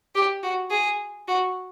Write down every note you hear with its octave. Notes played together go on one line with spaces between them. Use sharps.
G4
F#4
G#4
F#4